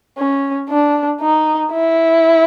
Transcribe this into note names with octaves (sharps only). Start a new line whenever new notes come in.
C#4
D4
D#4
E4